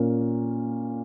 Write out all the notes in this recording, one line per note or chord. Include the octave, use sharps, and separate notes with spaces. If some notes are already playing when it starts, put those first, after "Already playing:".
Already playing: A#2 A#3 C#4